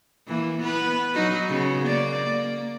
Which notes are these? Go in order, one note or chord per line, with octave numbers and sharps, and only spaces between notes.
E3 A#3
B3 B4
F#3 D#4 F#4
C#3 B3
A#3 D5
A#3